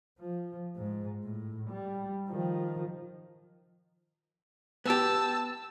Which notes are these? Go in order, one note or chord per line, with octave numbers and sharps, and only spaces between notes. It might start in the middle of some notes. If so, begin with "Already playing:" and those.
F3
G#2
A2
G3
D#3 F3
B3 G4 A5 E6